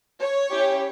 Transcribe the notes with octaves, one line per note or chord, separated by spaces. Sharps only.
C#5
C#4 E4 G4